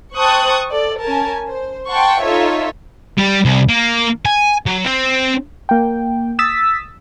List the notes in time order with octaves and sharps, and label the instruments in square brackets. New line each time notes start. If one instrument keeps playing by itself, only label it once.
[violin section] C5 G5 A5 C#6 D#6 F#6
A4 D5
C#4 A#4 G#5 A5
C5
F#5 G5 A5 C6 C#6
D#4 F4 A4 C#5 E5
[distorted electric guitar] G3
C2
A#3
G#5
F#3
C4 C5
[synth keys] A#3 G5
D#6 E6 A6 B6